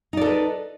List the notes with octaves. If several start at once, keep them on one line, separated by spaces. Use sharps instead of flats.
D#4 A4 B4 D5